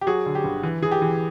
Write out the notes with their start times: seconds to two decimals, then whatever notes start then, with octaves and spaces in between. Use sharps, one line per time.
0.01 G4
0.07 F#3 F#4 G#4
0.26 D3
0.35 G4
0.44 G1
0.63 E3
0.82 E3 G#4
0.91 G4
1.02 E3